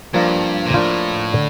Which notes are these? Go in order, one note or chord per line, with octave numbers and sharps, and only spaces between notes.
G2 F3 A#3 D4 F4
A#2
A2 F3 A#3 D4 F4
D3